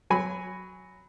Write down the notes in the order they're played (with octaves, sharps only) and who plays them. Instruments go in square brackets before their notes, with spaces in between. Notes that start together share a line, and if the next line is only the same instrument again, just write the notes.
[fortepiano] F#3 G#5 B5